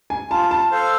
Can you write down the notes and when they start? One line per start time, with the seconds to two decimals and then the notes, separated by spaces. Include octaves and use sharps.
0.10 G#5
0.31 F4 A5
0.51 A5
0.72 A4 C5 F5